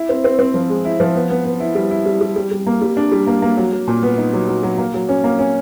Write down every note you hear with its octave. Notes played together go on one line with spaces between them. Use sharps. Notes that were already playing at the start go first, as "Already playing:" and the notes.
Already playing: E4
C4
C4
C4
F3
G#3
E4
F3
B3
B3
B3
E4
G3
E4
G3
G3
G3
G3
A#3
G3
D4
G3
A#3
A#3
F#3
F#3
A#2
B3
D#4
F#3
F#3
F#3
A#3
F#3
C#4
A#3
C#4